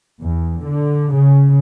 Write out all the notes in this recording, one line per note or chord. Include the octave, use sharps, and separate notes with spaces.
E2
D3
C#3